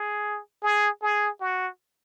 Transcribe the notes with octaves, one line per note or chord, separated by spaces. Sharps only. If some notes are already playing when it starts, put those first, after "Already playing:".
Already playing: G#4
G#4
G#4
F#4